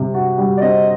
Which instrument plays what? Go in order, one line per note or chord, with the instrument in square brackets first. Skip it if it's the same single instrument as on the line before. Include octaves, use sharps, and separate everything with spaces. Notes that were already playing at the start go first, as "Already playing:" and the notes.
Already playing: [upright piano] C3 G3
F#4
G3
[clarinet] D5
[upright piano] C4 [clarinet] D#5